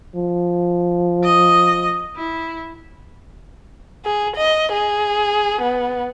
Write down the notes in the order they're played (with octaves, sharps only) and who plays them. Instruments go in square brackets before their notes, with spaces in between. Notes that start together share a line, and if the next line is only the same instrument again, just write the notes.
[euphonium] F3
[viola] D#5
E4
[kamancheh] G#4
D#5
G#4
B3